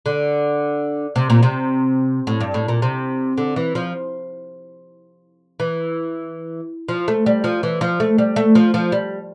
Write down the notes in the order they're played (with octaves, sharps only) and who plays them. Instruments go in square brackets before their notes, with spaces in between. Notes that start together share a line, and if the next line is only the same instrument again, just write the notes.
[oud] D3
C3
A#2
C3
A2
G2
A2
A#2
C3
D3
E3
F3
E3
F3
A3
G3
F3
E3
F3
A3
G3
A3
F3
F3
G3